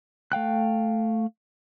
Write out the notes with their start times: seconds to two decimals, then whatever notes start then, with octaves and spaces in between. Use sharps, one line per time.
0.32 A3 F5 G5 F#6